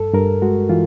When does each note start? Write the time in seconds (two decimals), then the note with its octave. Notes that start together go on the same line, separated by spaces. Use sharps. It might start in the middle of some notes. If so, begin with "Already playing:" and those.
Already playing: G2 A4
0.14 G2 A#4
0.42 G#3 F#4
0.69 E3 F4